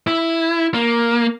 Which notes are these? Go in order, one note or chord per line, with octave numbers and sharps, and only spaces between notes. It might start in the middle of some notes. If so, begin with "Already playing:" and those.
E4
A#3